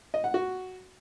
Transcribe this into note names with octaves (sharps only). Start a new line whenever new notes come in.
D#5
F#5
F#4